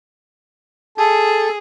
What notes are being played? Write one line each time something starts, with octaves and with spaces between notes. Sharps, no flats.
G#4 A4